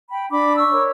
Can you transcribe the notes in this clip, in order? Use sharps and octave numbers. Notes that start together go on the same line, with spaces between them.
G5 B5
D4 B5 D6
C#6 E6
A#4 C#5